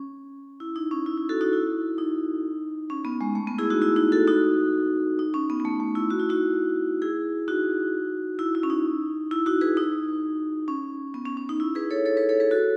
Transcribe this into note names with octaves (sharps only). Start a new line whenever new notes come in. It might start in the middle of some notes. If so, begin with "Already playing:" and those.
Already playing: C#4
E4
D#4
C#4
E4
E4
F#4 A4
D#4 F#4
E4
D#4
C#4
B3
G#3
A3
B3
E4 G#4
D#4 F#4
E4
D#4
F#4 A4
D#4 F#4
D#4
C#4
B3
B3
A3
A3
E4
F#4
E4
D#4 F#4
E4 G#4
D#4 F#4
E4
E4
C#4
D#4
E4
D#4 F#4
G#4 B4
D#4
C#4
B3
C#4
C#4
D#4
E4
G#4 B4
A4 C#5
A4 C#5
G#4 B4
A4 C#5
G#4 B4
F#4 A4